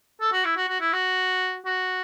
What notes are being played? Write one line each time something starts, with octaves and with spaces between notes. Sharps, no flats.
A4
F#4
E4
F#4
F#4
E4
F#4
F#4